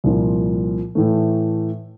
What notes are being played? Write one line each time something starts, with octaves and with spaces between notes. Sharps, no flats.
C2 A#2 F3
A2 E3 A3